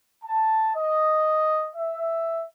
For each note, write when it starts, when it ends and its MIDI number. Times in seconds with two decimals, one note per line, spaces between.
0.23 0.71 81
0.73 1.68 75
1.75 2.45 76